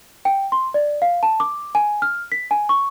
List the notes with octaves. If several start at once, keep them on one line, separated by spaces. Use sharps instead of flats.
G5
C6
D5
F5
A5
D6
G#5
F6
B6
G#5
C#6